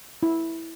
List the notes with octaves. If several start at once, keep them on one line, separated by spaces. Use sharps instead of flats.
E4